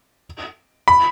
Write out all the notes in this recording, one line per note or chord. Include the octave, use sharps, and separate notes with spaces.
B5